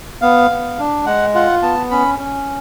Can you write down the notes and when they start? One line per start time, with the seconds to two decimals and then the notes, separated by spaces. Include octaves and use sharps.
0.22 B3 F5
0.51 B3
0.79 D4
1.06 G#3 F#5
1.34 F4 F#5
1.62 B3 A5
1.91 C#4 B5
2.19 C#4